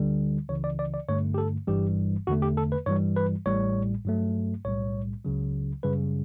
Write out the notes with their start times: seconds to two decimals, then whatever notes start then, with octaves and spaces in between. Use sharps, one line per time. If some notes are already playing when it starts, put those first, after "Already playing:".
Already playing: D2 D3 G3
0.49 C#2 C#3 E3 C#5
0.64 D5
0.79 D5
0.94 D5
1.09 G2 D3 A3 C#5
1.34 G4
1.38 A4
1.68 G1 G2 E3 G3 G4
2.27 E2 D3 A3 F#4
2.42 G4
2.57 A4
2.72 B4
2.86 G2 E3 G3 C#5
3.17 B4
3.46 A1 A2 G3 C#5
4.05 G2 F#3 A3
4.65 B1 A2 G3 C#5
5.24 C#2 C#3 F#3
5.83 F#2 C#3 G3 B4